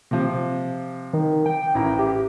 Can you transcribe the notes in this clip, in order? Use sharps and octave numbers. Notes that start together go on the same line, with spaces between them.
C3 F3
D#3
G5
A1 E4 A#5
G4